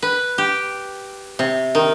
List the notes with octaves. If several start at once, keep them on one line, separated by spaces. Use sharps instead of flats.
B4
G4
C3
D#3